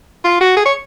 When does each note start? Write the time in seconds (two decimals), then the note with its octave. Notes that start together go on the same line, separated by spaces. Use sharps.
0.25 F4
0.41 F#4
0.57 G#4
0.66 C#5